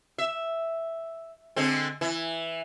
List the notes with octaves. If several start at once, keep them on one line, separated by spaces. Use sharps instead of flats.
E5
D3 G#3 C4
E3